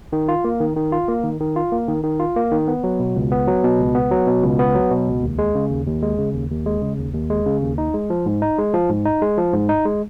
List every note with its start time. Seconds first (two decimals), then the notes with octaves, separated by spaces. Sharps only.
0.13 D#3
0.28 F4
0.44 A#3
0.60 D#3
0.76 D#3
0.92 F4
1.08 A#3
1.24 D#3
1.40 D#3
1.56 F4
1.72 A#3
1.88 D#3
2.04 D#3
2.20 F4
2.36 A#3
2.52 D#3
2.68 B3
2.84 F#3
2.99 B2
3.16 C#2
3.32 B3
3.47 F#3
3.64 B2
3.79 C#2
3.95 B3
4.11 F#3
4.27 B2
4.43 C#2
4.59 B3
4.75 F#3
4.91 B2
5.07 C#2
5.23 D#2
5.38 G#3
5.55 C#3
5.71 D#2
5.87 D#2
6.03 G#3
6.18 C#3
6.34 D#2
6.50 D#2
6.66 G#3
6.82 C#3
6.98 D#2
7.14 D#2
7.30 G#3
7.46 C#3
7.62 D#2
7.78 D#4
7.94 G#3
8.10 F3
8.26 G#2
8.42 D#4
8.58 G#3
8.74 F3
8.90 G#2
9.06 D#4
9.22 G#3
9.38 F3
9.53 G#2
9.69 D#4
9.85 G#3